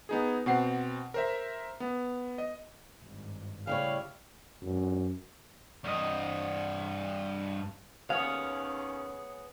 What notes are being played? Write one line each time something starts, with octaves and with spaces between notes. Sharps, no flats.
B3 D#4 G#4
B2 C4 F#5 C7
A#4 C5 E5
B3
D#5
G#1 G2
A2 C#3 G3 E4 C#5 F5
F#2
G2 D#5
D#2 B3 C#4 G#4 C#5 F5